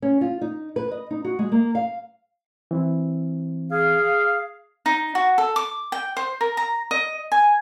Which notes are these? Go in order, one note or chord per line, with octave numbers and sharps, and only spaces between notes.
C#4
F4
D#4
B4
D#5
D#4
F#4
G#3
A#3
F5
E3 C4 E4
G#4 F5
D#4
F#4
A4
D6
G5
C5
A#4
A#5
D#5
G#5